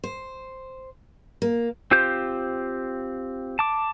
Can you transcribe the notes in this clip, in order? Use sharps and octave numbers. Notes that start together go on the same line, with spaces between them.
C5
A#3
C4 F4 G4 C5 G6
A5 D6